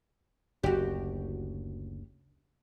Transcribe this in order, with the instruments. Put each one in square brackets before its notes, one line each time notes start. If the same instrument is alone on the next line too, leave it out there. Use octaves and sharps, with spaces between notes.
[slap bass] F#1 D2 [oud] F#4 G4